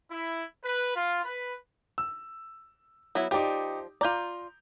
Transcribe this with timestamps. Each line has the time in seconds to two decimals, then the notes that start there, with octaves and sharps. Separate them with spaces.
0.10 E4
0.64 B4
0.96 F4
1.25 B4
1.98 E6
3.15 F#3 B3 E4
3.31 F3 D#4 G4 D5
4.01 F4 D5 A#5 G6 F7